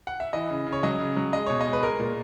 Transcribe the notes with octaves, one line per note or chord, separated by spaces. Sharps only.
F#5
E5
E3 D#5
C#3
C#3
C#5
F#3 D#5
C#3
F#3
G#3 D#5
B2 C#5
D#5
G#3
B4
G#3 A#4
A#2